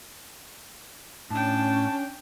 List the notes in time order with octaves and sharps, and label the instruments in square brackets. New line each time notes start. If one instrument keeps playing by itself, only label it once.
[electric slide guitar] A2 [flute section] C#4 [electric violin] D4 G5 [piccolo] A5